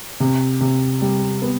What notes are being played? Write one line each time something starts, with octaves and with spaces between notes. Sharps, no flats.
C3
C3
G3
B3